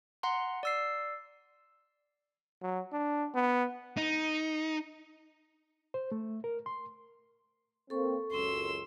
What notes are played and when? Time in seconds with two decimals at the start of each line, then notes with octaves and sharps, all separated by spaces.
0.23 F#5 A#5 C6
0.63 D5 E6 C7
2.62 F#3
2.92 D4
3.34 B3
3.97 D#4
5.94 C5
6.12 A3
6.44 A#4
6.66 C6
7.90 A#3 C4 A4 C#6
8.32 C#2 F#2 C6 E6